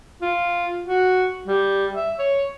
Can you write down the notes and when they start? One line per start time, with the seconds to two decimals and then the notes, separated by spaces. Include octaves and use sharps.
0.22 F4
0.86 F#4
1.48 G3
1.95 E5
2.19 C#5